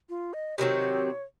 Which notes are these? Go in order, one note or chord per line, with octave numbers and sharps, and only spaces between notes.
F4
D#5
C3 D#3 F#3 C4 C#5